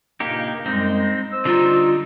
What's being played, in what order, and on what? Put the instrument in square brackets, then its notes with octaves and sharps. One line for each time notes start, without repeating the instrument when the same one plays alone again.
[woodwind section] G2 A#2 C#3 [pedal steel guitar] A#3 D#4 G4
[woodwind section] F#2 G3 G#3 [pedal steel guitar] C4 D#4
[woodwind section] C5 E6
[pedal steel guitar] D3 G3 D#4 [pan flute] F4